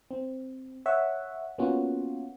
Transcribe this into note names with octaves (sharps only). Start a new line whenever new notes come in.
C4
C#5 E5 F#5
A#3 B3 C#4 F4 F#4